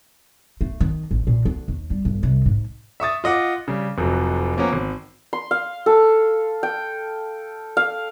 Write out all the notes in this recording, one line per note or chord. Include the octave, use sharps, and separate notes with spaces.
A3
D#3
A1
A#2
D2
D#2
G3
G1
C2
G#2
E5 C#6 D#6 A6
F4 D#5 F#5 D6
C#3 G3
F1 F2 F#3
F3 A#3 B3 C#4
G#1
C6
F5
A4
G5
F5